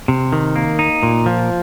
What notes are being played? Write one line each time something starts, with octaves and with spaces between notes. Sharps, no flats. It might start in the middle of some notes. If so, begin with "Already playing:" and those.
C3
D#3
A#3
D#4
A#2
F3